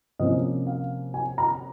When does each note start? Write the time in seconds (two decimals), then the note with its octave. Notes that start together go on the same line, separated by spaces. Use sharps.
0.19 C3 F3 A#3 C#4 D#5
0.67 F5
1.14 G#5
1.38 A#5